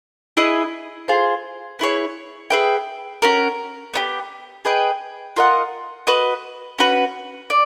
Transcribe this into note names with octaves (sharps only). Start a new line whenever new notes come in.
E4 G#4 B4 D#5
F4 G#4 C5
B3 E4 G#4 C#5
G#4 B4 E5 G5
C#4 F#4 A#4
B3 D#4 G4
G#4 B4 D#5 G5
F4 A#4 D#5 F#5
F#4 B4 D#5
C#4 F#4 B4
D5